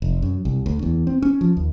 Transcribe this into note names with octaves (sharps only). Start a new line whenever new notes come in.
F1
F#2
C2
D2
E2
C4
C#4
F3
D#2